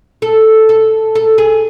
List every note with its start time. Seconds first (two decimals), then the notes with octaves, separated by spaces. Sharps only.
0.22 A4
0.69 A4
1.15 A4
1.38 G#4